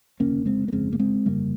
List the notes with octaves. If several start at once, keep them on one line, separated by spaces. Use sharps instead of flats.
F1 D#2 C#3 A#3 C#4
G#3 C4
A#3
G1 F2 C#3 G#3 C4
A#3
G#3 C4
G1 F2 C#3 G3 A#3